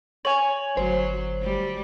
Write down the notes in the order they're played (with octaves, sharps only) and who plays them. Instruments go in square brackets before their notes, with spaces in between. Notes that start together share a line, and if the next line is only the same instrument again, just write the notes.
[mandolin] C#5 G#5 [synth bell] F#7
[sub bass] G1 [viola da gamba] F#3 [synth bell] C5
[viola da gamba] G3